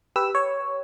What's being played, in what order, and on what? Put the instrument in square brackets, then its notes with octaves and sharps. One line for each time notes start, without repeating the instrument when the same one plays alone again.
[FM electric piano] G4 B4 E6
C#5